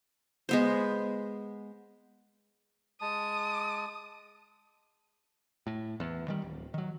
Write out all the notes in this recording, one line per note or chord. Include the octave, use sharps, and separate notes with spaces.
G#3 B3 C5
G#3 A5 D#6
A2
E2
D#3 G3
D1
D#3 F#3